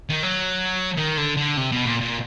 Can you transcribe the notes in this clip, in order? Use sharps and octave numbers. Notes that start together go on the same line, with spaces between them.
D#3
F#3
D#3
D3
D3
C3
B2
A#2
A#2